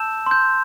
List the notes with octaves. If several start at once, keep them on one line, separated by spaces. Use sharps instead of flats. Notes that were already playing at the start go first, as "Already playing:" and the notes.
Already playing: A5 E6 G6 E7
C6 G6